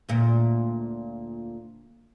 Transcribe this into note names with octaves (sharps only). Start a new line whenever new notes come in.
D2 A#2